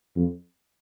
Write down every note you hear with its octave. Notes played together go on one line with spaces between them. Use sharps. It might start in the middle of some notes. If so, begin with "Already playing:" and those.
F2